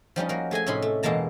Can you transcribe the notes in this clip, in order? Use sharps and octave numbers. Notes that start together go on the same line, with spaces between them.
F3 G3 C#4 D#4
F3 A#3 F#4 A#4
A3 G#4 D#5 G#5
A2 C3 C#4 D#4 B5 C6
A3
E2 B2 G#3 A#3 A5 A#5